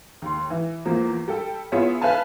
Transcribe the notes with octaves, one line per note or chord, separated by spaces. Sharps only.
D#2 C6
E3
E2 F3 A#3
G3 A4 G5
B3 E4 F4 G#4 C#5 E5
B4 E5 F5 G#5 A5